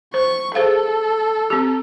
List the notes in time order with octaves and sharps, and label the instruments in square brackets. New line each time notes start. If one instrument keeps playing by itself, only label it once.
[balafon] C5 [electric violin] C#6
[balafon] G#4 C5 F5 [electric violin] A4
[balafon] C4 G4